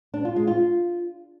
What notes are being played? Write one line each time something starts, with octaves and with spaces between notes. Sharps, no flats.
D4
F4
G#3
F4